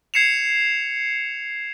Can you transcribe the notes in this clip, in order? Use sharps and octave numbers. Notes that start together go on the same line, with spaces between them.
G#6 C7 C#7 E7 F7